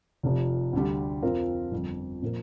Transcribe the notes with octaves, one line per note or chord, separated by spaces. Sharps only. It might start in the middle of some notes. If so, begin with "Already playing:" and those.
F1 F2 C3 F3
D2 D3 G3
F2 F3 C4 F4 A#4
G1 F2 F3
A#2 F3 C4 A#4